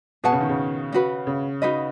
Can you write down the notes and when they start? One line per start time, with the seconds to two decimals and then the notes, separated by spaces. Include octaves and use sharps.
0.24 B2 G#4 B4 F#5 A5
0.32 C#3
0.40 D#3
0.49 C#3
0.92 C#4 F#4 B4
1.27 C#3
1.62 D#4 F#4 B4 D#5